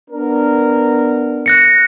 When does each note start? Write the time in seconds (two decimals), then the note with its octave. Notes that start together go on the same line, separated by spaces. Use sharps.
0.11 B3 D4 A#4
1.46 F#6 A#6 C#7